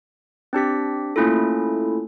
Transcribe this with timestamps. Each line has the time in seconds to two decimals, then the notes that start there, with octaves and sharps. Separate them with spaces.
0.53 C4 D4 G4 B6
1.16 A3 A#3 C#4 E4 F4 A4